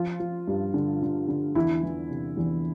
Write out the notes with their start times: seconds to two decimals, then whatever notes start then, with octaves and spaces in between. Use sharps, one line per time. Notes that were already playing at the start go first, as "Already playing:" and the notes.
Already playing: F3 F4
0.20 F3
0.47 G2
0.74 D3
1.02 D3
1.28 D3
1.55 E2 E4
1.83 E3
2.10 C3
2.37 E2